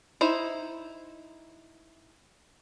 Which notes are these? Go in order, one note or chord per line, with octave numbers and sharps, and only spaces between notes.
D#4 E4 C5